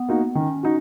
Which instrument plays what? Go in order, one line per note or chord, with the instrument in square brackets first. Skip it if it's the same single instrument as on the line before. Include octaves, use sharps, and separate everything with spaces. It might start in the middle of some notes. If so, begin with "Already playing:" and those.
Already playing: [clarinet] B3
[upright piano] A#3 D#4 F#4
[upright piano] D#3 [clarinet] C#4
[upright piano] D#4 F#4